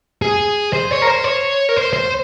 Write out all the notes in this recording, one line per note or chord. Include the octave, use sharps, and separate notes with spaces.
G#4
C5
C#5
A#4
C5
C#5
A#4
C5
C5